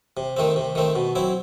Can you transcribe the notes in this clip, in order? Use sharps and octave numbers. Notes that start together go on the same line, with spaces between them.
C3
D#3 A3 C4
C3
D#3 A3 C4
B2
F#3 C4 E4